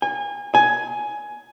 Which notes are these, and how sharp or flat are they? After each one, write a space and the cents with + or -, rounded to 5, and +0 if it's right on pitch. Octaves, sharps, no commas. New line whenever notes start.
G#5 -30
G#5 +10